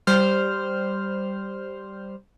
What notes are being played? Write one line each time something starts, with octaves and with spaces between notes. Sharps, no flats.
G3 C5 F6